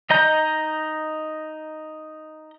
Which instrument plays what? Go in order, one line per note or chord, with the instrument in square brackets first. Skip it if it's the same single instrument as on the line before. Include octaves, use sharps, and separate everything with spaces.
[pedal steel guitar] D#4 D#5 A#5 G6